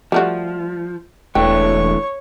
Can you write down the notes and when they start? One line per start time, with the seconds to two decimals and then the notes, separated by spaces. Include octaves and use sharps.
0.12 F3 G3 A3 F#4
1.35 E1 E3 A3 D4 C#5 G5 C#6